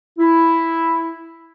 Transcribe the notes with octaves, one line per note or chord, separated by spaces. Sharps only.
E4